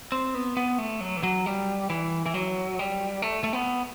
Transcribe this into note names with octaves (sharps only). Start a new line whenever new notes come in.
C4
B3
B3
A3
F#3
E3
F#3
G3
E3
E3
F#3
G3
A3
A3
B3